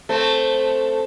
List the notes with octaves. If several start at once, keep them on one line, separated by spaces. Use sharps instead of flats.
A3 C4